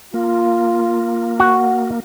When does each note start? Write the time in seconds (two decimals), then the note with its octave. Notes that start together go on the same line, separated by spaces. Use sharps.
0.14 A#3 F4
1.40 F#4